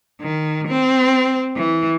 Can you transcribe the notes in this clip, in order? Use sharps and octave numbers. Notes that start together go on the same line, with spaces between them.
D#3
C4
E3